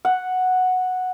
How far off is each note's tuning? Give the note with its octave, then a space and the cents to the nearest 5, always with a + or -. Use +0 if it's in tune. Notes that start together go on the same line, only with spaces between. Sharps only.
F#5 -5